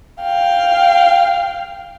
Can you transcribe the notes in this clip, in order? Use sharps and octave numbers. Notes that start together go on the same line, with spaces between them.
F5 G5